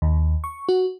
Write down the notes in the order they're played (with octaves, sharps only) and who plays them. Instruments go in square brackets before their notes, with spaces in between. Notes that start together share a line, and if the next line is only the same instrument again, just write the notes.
[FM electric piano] D#2
C#6
F#4